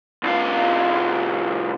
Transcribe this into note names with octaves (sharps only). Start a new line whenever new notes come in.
C2 F4